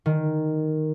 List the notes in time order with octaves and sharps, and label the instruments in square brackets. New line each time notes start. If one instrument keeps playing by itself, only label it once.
[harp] D#3